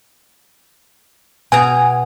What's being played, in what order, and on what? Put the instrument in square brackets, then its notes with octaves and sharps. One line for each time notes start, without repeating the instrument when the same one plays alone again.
[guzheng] B2 G#4 A#5 [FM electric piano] G#5